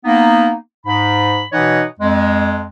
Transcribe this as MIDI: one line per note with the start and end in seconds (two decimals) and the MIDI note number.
0.05 0.54 58
0.05 0.54 59
0.05 0.54 63
0.85 1.44 44
0.85 1.44 83
1.52 1.84 47
1.52 1.84 52
1.52 1.84 63
1.52 1.84 73
1.52 1.84 75
1.52 1.84 78
1.99 2.65 41
1.99 2.65 56